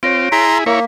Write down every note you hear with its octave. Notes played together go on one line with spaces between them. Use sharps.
C4 F4 C#5 A#6 D7
E4 G#4 A#5 C6 B6
A#3 E4 A#4 C#5